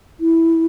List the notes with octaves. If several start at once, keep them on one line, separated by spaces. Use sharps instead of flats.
E4